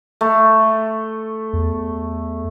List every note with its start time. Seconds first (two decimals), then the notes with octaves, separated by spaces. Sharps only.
0.21 A3
1.53 E2